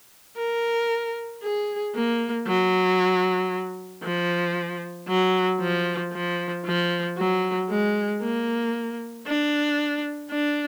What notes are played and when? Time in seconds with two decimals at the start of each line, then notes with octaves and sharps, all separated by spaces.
0.38 A#4
1.43 G#4
1.95 A#3
2.47 F#3
4.04 F3
5.08 F#3
5.60 F3
6.13 F3
6.66 F3
7.18 F#3
7.70 G#3
8.22 A#3
9.27 D4
10.31 D4